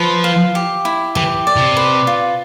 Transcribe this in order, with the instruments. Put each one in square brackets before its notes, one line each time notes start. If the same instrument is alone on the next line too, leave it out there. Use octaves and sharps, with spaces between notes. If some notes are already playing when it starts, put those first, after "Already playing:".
Already playing: [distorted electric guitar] F3 [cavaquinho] B4
[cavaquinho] F5
G4
E4
[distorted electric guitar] E3 [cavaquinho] G4
[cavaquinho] D5
[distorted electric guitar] C3
[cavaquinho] B4
F4